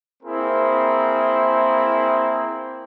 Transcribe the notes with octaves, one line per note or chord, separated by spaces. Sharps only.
A#3 C4 E4 G#4 A#4 C5